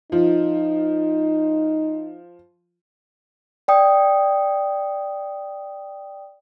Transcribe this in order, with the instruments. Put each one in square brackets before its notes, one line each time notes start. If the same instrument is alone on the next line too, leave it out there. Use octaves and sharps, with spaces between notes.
[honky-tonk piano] F3 [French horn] D#4
[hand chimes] D5 G5 D#6